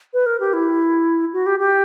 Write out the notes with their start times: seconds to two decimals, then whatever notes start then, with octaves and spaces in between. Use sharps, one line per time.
0.13 B4
0.26 A#4
0.40 G4
0.53 E4
1.33 F#4
1.46 G4
1.60 G4